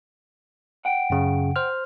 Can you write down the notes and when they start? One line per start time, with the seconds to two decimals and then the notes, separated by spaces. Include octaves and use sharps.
0.85 F#5 G5
1.10 F#2 C#3
1.56 C5 F6